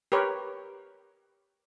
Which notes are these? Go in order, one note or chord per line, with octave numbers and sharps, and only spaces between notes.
G4 A#4 B4 C#5